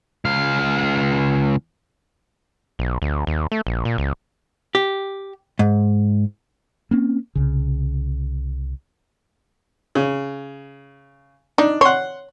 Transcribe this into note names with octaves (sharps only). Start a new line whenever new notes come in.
C#2 F5
B1
D2
D#2
A3
A#1
A#2
C#2
G4
G#2
A#3 C4 C#4
C2 C#3
C#3
D4 D#4
C#5 F#5 C6